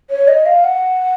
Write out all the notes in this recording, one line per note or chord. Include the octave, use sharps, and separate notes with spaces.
C#5
D#5
F5
F#5